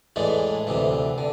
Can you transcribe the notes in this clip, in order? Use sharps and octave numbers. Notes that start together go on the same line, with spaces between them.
A2 E3 G#3 D4
D2 C3 E3
D3